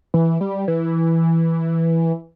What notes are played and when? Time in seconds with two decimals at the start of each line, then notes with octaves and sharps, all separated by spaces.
0.14 E3
0.41 G3
0.68 E3